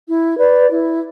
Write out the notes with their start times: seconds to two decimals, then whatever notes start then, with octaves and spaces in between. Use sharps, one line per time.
0.09 E4
0.39 B4 D5
0.69 E4